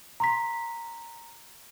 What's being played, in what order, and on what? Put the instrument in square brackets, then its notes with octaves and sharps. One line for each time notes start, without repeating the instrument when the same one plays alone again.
[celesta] A#5 C6 B6